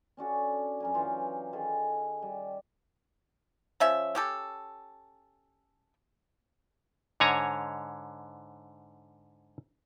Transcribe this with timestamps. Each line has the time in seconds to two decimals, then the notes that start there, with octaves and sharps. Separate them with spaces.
0.17 C#4 D4 F#4 A4
0.80 F#2 A#4 G#5
0.94 E3 F#3 F4 G5
1.53 D#3 G#4 A4
2.22 G3
3.80 F3 C#4 E5
4.15 C#4 G4 A4
7.20 G#2 D3 C#5 G#5 A#5